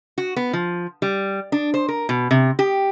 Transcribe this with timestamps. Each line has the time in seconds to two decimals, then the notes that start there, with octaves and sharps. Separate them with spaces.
0.18 F#4
0.36 B3
0.53 F3
1.02 G3
1.52 D4
1.74 C5
1.89 A#4
2.09 B2
2.31 C3
2.59 G4